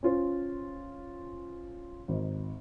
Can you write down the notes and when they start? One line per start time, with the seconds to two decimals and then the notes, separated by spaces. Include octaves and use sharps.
0.03 C#4 F4 C5
2.08 G#1 D#4